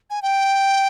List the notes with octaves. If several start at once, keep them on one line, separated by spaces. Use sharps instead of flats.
G#5
G5